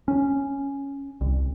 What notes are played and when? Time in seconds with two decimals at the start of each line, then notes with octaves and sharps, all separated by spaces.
0.08 C#4
1.21 C2